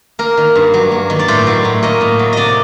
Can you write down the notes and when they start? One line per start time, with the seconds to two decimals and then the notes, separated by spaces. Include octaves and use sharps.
0.19 A#3 A#4
0.37 D#3
0.55 G2
0.74 F#3
0.92 A#3
1.10 D#3
1.19 D5
1.28 A2 C5
1.47 F#3
1.65 A2
1.83 A#3 D#5
2.01 A2
2.19 F#3
2.33 C3 D5 D#5